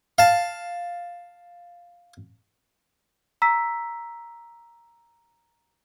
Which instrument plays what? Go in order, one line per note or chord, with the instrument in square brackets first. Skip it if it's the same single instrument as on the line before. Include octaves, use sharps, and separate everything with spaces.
[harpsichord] F5 A5
[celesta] A#5 E6 B6